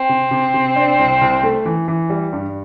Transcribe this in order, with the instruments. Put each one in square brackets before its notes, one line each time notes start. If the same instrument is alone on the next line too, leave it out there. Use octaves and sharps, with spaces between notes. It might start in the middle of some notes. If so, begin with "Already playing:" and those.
Already playing: [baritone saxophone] C4
[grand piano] C3
C3
C3
D4
C2
C2
A3
E3
E3
G3
G2